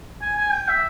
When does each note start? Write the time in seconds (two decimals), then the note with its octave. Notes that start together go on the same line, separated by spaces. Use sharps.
0.22 G#5
0.37 G#5
0.52 G5
0.68 E5